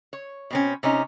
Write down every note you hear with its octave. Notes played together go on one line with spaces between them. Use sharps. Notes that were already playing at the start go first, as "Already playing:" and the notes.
C#5
B2 C4 C#4
C3 C#4 D#4